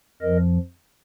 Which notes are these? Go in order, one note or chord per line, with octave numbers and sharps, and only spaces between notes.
F2 F3 A#4 D#5